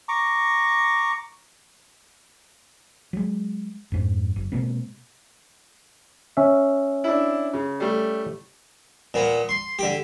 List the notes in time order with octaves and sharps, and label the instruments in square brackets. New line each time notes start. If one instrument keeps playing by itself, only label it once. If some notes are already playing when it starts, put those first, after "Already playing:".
[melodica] A#5 C#6 D6
[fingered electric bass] F#3 G#3
F2 G#2
F#1
B2 G#3 A#3 C4
[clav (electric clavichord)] C#4 E5
[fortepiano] D4 E4
C#3
G3 A3
[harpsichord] A#2 B3
C6
D3 G4